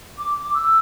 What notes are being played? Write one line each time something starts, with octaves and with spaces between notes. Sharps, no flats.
D6
D6
E6